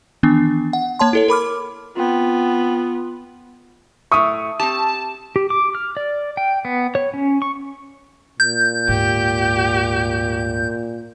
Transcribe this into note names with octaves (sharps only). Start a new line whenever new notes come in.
D#3 E3 B3 D4
F#5
A#3 C#5 A5 C6
E4 A4 C#5
A#4 B5 D6 F6
B3 C4 F4 G5
A2 E5 C#6 D#6
C4 G4 A5
G4
D6
F6
D5
G5
B3
C#5
C#4
C#6
A#2 G6
D2 G#2 G4